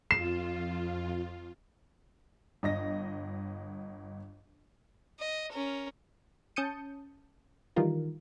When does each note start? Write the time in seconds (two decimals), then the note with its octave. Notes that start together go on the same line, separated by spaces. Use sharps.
0.11 F2 F4 C7 E7
2.63 G1 D#5 A#6
5.19 D#5
5.52 C#4 A#4
6.56 C#4 A5 D#6 G6 C#7 D#7
7.76 D#3 E3 G3 F4 A#4